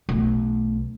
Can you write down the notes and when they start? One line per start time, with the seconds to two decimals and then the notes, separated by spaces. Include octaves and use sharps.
0.09 B1 A3